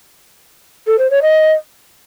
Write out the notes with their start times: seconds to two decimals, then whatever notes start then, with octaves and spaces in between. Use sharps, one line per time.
0.87 A4
0.98 C5
1.10 C#5
1.21 D#5